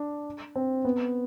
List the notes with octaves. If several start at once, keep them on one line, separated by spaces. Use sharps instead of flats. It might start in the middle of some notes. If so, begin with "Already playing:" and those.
Already playing: D4
C4
B3